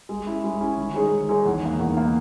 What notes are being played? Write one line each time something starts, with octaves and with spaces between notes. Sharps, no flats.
G#3
C#4 E4
G#3
C#4 E4
D#3
G#3 D#4 G#4 C#5
D#3
G#3 D#4 G#4 C#5
E2
D#3 A#3 D#4
E2
D#3 A#3 D#4